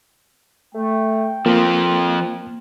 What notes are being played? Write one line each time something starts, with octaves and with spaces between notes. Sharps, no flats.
A3 G5
F3 A#3 C4 F4